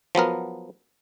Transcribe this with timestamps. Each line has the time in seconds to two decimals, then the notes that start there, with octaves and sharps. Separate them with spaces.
0.15 F3 F#3 B3 A#4